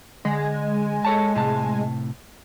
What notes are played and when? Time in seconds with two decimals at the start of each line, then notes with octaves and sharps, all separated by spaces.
0.25 D3 G#3
1.05 A4 C#5 A5
1.35 A2 C3 A5